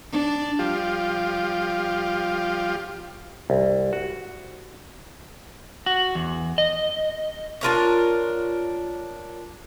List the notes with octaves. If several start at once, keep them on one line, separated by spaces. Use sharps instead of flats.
D4
F3 G3 F4 G4
C2
F#4
F#4
E2
D#5
D4 F4 A#4 C#5